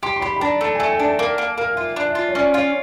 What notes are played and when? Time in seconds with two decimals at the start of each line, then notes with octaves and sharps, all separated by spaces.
0.03 G4 C6
0.16 C6
0.21 G4 B5
0.37 B5
0.41 D4 A#5
0.61 A3 A5
0.75 A3 G#5
0.89 G5
1.00 D4
1.05 A5
1.19 A#3 G5
1.38 A#3
1.58 A#3 F5
1.71 F5
1.76 F4 E5
1.96 D4
2.06 E5
2.15 F4
2.29 C#5
2.35 C#4 D5
2.54 F4 C#5